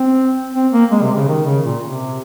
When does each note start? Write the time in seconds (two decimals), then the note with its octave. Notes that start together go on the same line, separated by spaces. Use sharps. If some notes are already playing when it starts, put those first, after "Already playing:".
Already playing: C4
0.55 C4
0.72 A#3
0.91 G#3
1.03 C3
1.16 C#3
1.28 D#3
1.46 C#3
1.65 A#2
1.83 C3